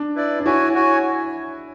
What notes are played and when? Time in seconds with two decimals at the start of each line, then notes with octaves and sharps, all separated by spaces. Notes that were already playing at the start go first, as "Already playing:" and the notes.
Already playing: D4
0.15 E4 B4 D5
0.40 D4
0.45 E4 F#4 C#5 G#5
0.75 F#4 C#5 G#5